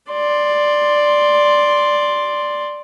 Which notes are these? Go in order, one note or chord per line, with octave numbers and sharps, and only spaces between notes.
D5 C6